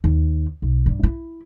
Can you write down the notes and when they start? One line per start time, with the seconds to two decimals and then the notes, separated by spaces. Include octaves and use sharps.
0.04 D#2
0.62 B1
0.86 G2 G3
1.03 E4